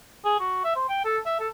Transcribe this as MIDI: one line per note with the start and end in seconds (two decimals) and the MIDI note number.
0.25 0.39 68
0.40 0.62 66
0.64 0.72 76
0.76 0.84 72
0.89 1.02 79
1.05 1.18 69
1.26 1.36 76
1.39 1.47 69